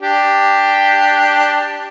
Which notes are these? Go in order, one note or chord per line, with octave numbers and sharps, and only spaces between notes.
D4 G4